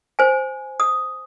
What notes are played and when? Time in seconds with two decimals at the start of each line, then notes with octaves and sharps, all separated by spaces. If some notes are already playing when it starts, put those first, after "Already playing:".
0.19 C5 G#5
0.80 D#6